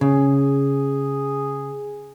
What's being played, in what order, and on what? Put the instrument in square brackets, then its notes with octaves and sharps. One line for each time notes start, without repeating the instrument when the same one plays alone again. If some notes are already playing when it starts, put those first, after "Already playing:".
[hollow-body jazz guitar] C#3 [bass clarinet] G#4